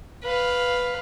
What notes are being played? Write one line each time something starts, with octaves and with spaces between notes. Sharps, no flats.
B4 F5